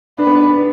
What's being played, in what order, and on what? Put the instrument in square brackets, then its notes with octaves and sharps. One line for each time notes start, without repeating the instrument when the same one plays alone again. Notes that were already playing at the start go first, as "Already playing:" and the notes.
[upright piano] D4 [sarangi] B4
[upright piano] B3
D4